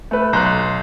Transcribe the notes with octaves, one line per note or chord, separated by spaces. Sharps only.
A3 B4
B1 A#5 C6 F#6 G6